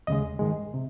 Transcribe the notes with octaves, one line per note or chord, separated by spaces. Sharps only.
D#2 C#3 G#3 D#5
G#2 D#3 G#3
C3